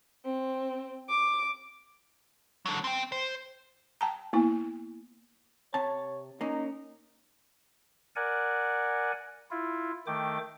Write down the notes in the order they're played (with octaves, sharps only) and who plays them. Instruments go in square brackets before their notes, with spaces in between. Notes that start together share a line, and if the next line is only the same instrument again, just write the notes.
[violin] C4
D6
[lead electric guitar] D3 F#3
C4 G5
C5
[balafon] G5 A5 A#5
A#3 B3 E4
[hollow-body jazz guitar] C3 A5 [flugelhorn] C#5
[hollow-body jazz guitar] A#3 C#4 [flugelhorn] D#4
[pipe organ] A#4 D5 F#5 G#5
E4 F4
D#3 A3 G5 D6